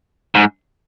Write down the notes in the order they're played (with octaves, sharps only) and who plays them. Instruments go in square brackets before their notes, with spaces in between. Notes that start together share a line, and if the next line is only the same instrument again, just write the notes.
[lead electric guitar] G#2